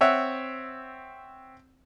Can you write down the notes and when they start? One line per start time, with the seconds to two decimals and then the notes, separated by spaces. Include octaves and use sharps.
0.01 C4 C#5 E5 F#5